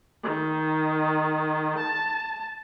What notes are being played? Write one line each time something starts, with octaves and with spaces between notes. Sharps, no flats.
D#3
A5